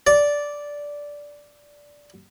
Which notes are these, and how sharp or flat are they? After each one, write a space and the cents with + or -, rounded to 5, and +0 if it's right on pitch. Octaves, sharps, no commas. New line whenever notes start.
D5 -10